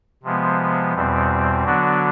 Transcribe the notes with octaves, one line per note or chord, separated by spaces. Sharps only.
C3 F3 G#3 B3
E2 B2 G3 C4
D3 F#3 B3 D4 F#4